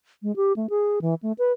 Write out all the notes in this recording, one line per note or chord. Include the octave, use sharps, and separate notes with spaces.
G#3
G4
A3
G#4
E3
A3
B4